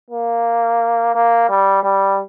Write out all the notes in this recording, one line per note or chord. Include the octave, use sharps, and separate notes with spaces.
A#3
A#3
G3
G3